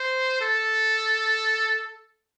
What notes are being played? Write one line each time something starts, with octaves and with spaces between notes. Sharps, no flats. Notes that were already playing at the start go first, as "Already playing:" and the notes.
Already playing: C5
A4